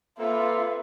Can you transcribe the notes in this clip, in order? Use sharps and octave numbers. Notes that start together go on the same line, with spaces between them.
A#3 C4 F4 A4 B4 E5